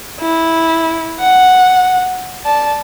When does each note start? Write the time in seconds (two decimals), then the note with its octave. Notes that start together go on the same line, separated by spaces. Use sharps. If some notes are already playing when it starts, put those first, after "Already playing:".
0.20 E4
1.20 F#5
2.44 D5 A5